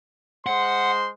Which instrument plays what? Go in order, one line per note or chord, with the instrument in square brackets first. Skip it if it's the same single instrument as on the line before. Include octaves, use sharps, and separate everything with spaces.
[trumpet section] G#3 C5 C6 [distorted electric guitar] F#5